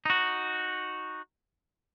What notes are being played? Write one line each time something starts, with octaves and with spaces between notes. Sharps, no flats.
D#4 F#4